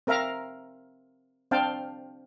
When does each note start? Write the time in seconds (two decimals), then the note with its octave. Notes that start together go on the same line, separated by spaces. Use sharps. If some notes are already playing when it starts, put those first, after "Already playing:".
0.07 C4 A#4 E5 F5 A#5
1.51 C4 D4 F5 G5 A5